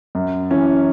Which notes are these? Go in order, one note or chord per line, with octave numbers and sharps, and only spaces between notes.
F#2
E3 C#4